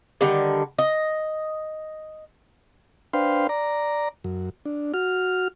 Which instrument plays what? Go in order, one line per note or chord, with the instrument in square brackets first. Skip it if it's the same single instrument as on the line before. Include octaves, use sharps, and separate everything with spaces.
[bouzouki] D3 D#3 G3
D#5
[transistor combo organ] D4 B4 C5 F5 G5 C6
D5 A#5
F#2
D4
F#4 F6